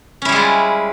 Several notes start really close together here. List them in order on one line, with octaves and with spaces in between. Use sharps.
C#4 E4 G3 G#3 F4